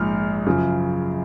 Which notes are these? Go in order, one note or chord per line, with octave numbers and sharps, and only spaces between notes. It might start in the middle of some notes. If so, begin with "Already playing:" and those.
Already playing: A#1 G#2 F3 F6
F#2 C#3 F3